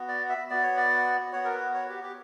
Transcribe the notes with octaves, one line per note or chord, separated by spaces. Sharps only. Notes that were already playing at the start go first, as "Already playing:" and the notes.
Already playing: B3 F#4
D5
E5
B3 F#4 D5
C#5
D5
B3 F#4 C#5
A#4
B4
C#5
G4
G4